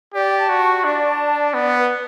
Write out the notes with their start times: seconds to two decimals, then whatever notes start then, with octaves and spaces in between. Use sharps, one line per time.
0.14 G4 D5
0.38 A5
0.49 F#4
0.60 C#6
0.84 D4 D5
1.07 A5
1.30 D5
1.54 B3 D5
1.77 B4